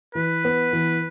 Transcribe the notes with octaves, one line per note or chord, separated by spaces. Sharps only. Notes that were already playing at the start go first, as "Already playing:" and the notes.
E3 B4
B3
E3